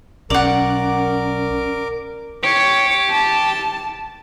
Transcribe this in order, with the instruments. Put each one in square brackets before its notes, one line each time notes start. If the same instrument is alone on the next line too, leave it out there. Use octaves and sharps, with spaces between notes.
[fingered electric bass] B1 [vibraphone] C#4 [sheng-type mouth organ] A#4 D6 [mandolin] D5 F#5
[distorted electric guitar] G4 [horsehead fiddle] C#5
[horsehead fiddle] A5